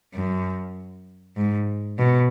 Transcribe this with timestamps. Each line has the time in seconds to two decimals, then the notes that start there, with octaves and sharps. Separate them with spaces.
0.15 F#2
1.37 G#2
1.99 B2